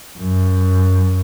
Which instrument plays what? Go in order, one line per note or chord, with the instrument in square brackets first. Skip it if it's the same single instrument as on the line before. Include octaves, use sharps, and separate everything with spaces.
[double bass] F#2